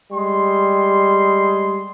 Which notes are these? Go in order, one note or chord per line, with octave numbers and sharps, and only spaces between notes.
G3 G#3 C6